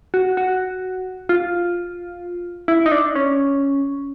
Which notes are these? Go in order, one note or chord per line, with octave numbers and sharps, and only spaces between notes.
F#4
F#4
F4
E4
D#4
D4
C#4